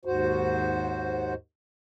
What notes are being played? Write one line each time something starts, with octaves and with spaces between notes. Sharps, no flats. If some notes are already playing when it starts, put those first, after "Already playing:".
D#2 G#2 F#4 C5